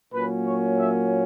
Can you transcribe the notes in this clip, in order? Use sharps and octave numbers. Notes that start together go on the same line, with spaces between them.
A#2 F#3 A#3 C#4 B4
C#5
E5